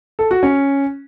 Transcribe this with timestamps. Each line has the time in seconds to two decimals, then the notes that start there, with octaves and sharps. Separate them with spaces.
0.19 A4
0.31 F#4
0.43 C#4